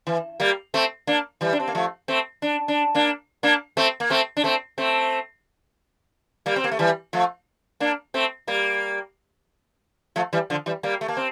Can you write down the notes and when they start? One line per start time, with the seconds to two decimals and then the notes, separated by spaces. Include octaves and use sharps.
0.07 E3
0.40 G3 A#3
0.74 A3 C4
1.07 A#3 D4
1.41 E3 G3
1.53 D4
1.60 C4
1.68 A#3
1.75 F3 A3
2.08 A3 C4
2.42 D4
2.68 D4
2.95 A#3 D4
3.43 A#3 D4
3.77 A3 C4
4.00 A#3
4.10 A3 C4
4.37 D4
4.44 A3 C4
4.78 A3 C4
6.46 G3 A#3
6.56 C4
6.64 A#3
6.71 A3
6.79 E3 G3
7.13 F3 A3
7.80 A#3 D4
8.14 A3 C4
8.47 G3 A#3
10.16 F3 A3
10.33 E3 G3
10.50 D3 F3
10.66 E3 G3
10.83 G3 A#3
11.01 A3
11.08 A#3
11.17 C4